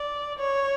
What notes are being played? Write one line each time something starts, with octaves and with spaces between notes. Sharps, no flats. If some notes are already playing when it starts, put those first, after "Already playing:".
Already playing: D5
C#5